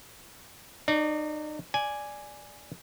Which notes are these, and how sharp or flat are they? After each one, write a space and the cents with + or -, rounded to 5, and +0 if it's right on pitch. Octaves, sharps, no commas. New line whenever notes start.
D#4 -35 D5 -15
D5 +0 G#5 +0